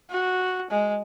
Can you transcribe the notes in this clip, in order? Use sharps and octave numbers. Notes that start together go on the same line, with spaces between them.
F#4
G#3